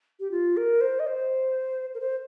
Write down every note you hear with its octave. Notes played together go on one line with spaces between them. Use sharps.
G4
F4
A#4
C5
D#5
C5
A#4
C5